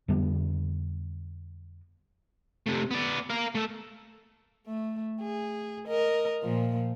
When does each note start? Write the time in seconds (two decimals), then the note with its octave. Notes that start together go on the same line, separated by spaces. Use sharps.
0.08 F2 D3 G3 B3
2.66 C3 A3
2.91 B3 D5
3.30 A#4 F5
3.55 A3 A4
4.67 A3
5.22 G#4
5.88 A#4 D#5
6.42 A#2 F3